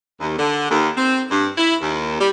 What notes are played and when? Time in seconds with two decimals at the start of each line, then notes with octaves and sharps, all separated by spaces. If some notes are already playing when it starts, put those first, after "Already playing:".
0.19 D#2
0.38 D3
0.70 D#2
0.96 C4
1.30 G2
1.57 E4
1.80 D#2
2.18 G3